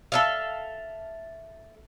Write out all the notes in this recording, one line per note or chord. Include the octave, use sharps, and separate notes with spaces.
A4 E5 F5